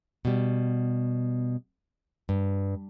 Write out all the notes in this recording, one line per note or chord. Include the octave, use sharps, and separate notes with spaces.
B2 G3
G2